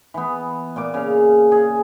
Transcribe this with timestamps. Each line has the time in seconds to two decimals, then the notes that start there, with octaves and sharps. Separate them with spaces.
0.14 E3 B3
0.76 A#2 D5 D6
0.94 C#3 F5
1.52 G#4